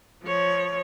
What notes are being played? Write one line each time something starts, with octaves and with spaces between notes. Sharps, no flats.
F3 C#5